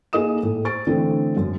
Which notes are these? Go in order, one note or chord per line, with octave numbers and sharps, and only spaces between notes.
A#3 D#4 G#4 D#5 D#6 E7
A2
C5 C#6 A6 D7
D3 E3 A3 C4 D4
F#2